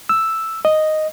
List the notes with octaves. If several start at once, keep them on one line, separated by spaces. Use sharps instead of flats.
E6
D#5